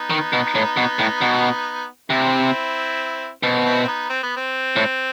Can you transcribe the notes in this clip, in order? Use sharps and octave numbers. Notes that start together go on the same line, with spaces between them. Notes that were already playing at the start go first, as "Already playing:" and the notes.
Already playing: B3 D#4
D#3
B2
A2
B2
A2
B2
C3 C4 E4
B2 C4
F#4
C4 E4
C4
B3 D#4
C4
B3
C4
A2